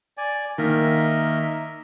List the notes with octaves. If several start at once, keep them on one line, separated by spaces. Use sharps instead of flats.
D5 G#5
D#3 A#3 A#4 D#5 E5